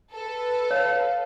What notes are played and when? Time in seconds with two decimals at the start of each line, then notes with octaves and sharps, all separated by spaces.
0.11 A4 B4
0.71 C#5 F5